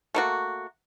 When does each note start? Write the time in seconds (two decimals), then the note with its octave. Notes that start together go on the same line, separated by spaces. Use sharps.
0.14 A3 A#3 F#4